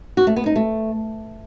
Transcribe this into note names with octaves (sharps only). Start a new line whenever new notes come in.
F#4
A3
B3
D#4
A3